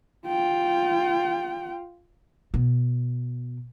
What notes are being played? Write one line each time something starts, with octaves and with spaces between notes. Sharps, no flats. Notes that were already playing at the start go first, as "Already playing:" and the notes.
F4 G5
B2